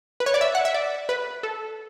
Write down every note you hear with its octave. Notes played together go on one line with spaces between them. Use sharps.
B4
C#5
D5
E5
F#5
E5
D5
B4
A4